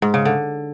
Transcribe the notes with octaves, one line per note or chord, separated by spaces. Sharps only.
G#2
C#3
D3